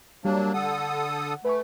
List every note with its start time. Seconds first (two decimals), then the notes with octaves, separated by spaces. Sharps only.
0.25 F#3 G3 A#3 D4 G4
0.54 D3 A4 F#5 D#6
1.45 A3 B4 G#5 C#6